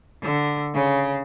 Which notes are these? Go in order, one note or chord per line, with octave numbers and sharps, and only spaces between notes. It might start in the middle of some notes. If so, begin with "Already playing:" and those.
D3
C#3